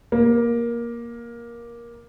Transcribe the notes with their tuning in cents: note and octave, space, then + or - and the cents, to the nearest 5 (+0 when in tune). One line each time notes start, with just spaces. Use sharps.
A#3 +15